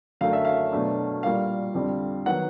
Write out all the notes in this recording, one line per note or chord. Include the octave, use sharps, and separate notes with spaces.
F#2 D3 F#3 A3 F5
E5
F5
B2 F#3 A3 D4
A#2 G3 A#3 F5
F2 D3 G3 C4
D#3 F#3 B3 F#5